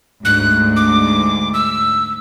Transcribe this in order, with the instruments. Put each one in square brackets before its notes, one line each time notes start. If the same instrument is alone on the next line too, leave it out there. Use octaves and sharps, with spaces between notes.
[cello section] D2 G#2 [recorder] F#6
[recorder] D6
E6